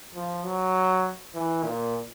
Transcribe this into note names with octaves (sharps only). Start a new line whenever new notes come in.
F3
F#3
E3
A#2